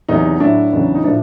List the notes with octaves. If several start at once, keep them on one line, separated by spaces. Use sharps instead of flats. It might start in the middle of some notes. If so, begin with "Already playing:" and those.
E2 C3 D#3 F#3 D#4
A2 F#3 D4 E4
E2 C#3 F#3
D#4
A#2 F3 D4 E4